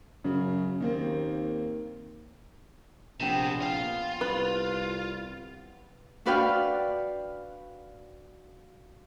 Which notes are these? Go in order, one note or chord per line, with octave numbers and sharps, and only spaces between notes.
F#2 C#3
D#2 D#3 A#3 C4
A#1 C3 B3 G5 G#5
F4
C2 B4
D4 F#4 B4 D5 F5 G5